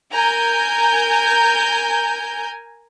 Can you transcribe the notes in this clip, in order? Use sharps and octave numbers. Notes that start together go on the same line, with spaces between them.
A#4 G#5 A#5 G6